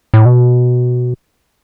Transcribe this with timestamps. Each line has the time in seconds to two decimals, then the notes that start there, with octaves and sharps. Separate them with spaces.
0.14 A2
0.26 B2